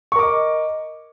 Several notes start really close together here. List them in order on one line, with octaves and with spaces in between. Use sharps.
C#6 A#4 D6 D#5